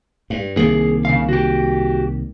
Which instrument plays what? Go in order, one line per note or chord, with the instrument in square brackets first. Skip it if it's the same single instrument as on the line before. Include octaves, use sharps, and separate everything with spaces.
[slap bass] G2
[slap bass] C2 D#3 A#3 [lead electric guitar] G#4
[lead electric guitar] C#3 F5
F#4 G4